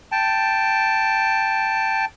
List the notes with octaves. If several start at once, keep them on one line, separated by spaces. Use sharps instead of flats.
G5 A5